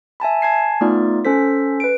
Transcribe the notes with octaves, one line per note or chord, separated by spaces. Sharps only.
E5 G#5 A5 B5
G#5 A5 G#6 C7
A3 B3 D#4 F4 D5
C#4 A4 C5 B6
B4 D7